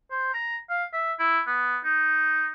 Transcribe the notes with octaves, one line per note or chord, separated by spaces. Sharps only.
C5
A#5
F5
E5
E4
B3
D#4